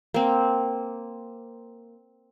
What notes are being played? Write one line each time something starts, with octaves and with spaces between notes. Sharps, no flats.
A#3 C4